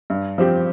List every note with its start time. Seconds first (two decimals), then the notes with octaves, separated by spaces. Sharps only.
0.10 G2
0.38 F3 C4 G4